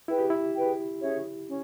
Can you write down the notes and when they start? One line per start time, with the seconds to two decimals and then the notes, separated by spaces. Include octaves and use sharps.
0.08 E4 G#4 B4 G5
0.19 G4
0.30 E4
0.55 G#4 B4 G5
1.01 C#4 G#4 C#5 E5
1.48 C#4